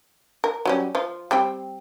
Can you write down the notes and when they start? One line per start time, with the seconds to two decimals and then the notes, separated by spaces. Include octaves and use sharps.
0.44 A#4
0.65 F#3 G3 C#4
0.95 F3 F4
1.31 G3 C4 G5